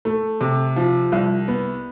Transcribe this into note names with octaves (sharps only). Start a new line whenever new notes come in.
A3
C3
F3
C2
B3